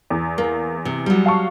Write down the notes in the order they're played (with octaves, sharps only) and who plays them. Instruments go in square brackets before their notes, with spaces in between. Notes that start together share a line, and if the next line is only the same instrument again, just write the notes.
[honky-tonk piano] E2
[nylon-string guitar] A#3
C3
F#3 G3
[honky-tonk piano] F5 A5 C#6